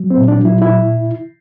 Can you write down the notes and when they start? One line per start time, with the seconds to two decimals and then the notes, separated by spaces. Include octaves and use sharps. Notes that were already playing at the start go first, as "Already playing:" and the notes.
Already playing: F#3
0.10 C4
0.17 A#2
0.28 D4
0.39 F#3
0.45 E4
0.62 A#2 E4